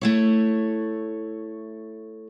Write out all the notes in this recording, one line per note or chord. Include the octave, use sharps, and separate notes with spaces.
A3 E4 C#5